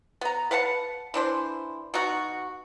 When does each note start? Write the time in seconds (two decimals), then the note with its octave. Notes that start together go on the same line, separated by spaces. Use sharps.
0.21 B3 A#5
0.51 B4 F5 F#5 A5
1.14 E3 D4 C5
1.94 B2 D#4 F#4